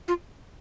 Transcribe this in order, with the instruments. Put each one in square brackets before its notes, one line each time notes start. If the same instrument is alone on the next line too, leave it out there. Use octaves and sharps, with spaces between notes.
[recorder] F4